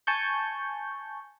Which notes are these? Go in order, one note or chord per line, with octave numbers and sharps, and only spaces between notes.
G#5 A5 C#6 G6